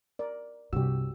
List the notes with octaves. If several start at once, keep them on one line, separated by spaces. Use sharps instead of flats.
A#4 D5
C2 G2 C3 F#4 G4 E6